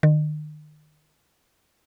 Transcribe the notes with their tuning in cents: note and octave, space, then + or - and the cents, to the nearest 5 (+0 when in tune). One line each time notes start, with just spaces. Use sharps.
D#3 -40